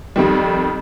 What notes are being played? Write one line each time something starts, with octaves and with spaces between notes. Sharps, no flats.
F2 D#3 G3